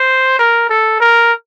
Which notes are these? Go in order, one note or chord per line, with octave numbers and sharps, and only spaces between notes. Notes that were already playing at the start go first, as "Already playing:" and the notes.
Already playing: C5
A#4
A4
A#4